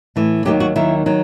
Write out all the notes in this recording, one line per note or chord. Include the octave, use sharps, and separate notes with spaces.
A2 E3
D#2 D#3 F#3 G4
F#4
D#2 D#3 F#3 E4
D#3 F#3